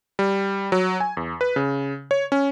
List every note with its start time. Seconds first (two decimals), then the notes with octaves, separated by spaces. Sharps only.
0.19 G3
0.72 F#3
1.00 G#5
1.17 E2
1.41 B4
1.56 C#3
2.11 C#5
2.32 C#4